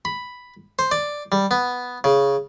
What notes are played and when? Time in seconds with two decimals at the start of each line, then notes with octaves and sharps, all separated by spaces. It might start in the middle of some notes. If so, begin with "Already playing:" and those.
0.05 B5
0.79 C5
0.91 D5
1.32 G3
1.51 B3
2.04 C#3